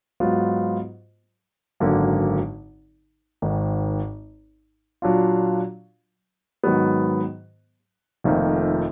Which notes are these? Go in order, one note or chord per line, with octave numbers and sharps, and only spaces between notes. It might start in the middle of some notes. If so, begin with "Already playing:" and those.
G#2 F#3 B3 F4
G#1 F#2 D3 F#3 A#3
G#1 G#2 D#3
A#2 F#3 D4 F4
G#2 D#3 F#3 B3
F1 F2 D#3 A#3 D#4